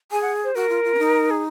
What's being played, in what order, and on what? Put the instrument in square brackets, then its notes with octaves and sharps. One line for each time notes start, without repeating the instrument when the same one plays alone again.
[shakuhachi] G#4 [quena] G#5
[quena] F#5
C5
[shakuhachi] F#4 [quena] A#4
[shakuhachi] F4
F4
C#4
D#4
[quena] G#4